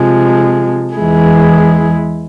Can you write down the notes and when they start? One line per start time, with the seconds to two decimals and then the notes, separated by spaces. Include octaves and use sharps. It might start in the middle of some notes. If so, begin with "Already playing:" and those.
Already playing: C3 F3 G#3
0.96 E2 E3 G#3 E4 G#4